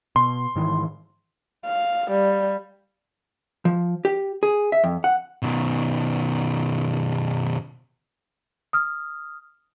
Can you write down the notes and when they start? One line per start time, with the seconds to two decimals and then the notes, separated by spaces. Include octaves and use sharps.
0.16 B2 C6
0.56 G#2 D#3 E3
1.66 F5
2.11 G3
3.65 F3
4.05 G4
4.43 G#4
4.72 E5
4.84 F2
5.04 F#5
5.42 B2 D#3
8.73 D#6 F6